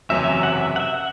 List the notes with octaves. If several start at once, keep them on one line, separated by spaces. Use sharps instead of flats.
F#1 E2 C3 F#3 C#4 E5
E5
F#5
E5
F#5
E5
F#5